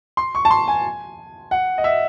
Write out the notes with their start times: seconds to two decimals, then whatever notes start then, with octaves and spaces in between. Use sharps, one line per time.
0.17 C6
0.35 C#6
0.45 A5
0.51 C6
0.68 G#5
1.51 F#5
1.78 D#5
1.84 E5